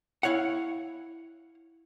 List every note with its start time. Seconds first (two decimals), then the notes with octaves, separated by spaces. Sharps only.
0.23 E4 C#5 F5 F#5